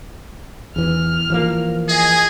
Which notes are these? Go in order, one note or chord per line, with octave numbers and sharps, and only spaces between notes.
E2 E3 F6
E3 F3 A#3
G#4 D#5 G#5